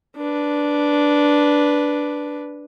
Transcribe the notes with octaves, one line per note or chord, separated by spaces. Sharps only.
D4 B4